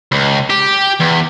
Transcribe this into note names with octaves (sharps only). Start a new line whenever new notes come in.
C#2
G4
E2